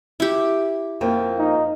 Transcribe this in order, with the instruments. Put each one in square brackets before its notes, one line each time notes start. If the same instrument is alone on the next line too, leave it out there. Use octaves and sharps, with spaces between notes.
[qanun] E4 G4
[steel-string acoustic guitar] F2 F3 A#3
[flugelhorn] D#4